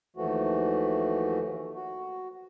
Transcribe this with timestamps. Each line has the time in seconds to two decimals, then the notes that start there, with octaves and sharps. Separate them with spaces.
0.16 D#2 E3 F3 A3 F#4
1.75 F#4